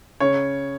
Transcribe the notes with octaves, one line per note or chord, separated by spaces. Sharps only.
C#3 C#5